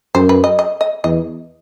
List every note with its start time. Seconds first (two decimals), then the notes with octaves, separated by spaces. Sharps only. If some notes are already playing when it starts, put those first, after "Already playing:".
0.15 F#2 C5
0.29 B4
0.44 D#5
0.59 D#5
0.81 D#5
1.04 E2 D#5